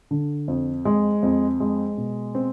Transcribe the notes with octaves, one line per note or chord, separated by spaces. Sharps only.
D3
F2
G#3
F2
G#3
B2
C4